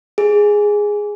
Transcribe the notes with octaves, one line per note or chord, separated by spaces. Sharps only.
G#4